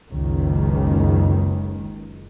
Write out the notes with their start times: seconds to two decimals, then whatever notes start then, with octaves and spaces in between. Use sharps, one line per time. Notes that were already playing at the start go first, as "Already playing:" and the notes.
0.10 F#1 C#2 D#3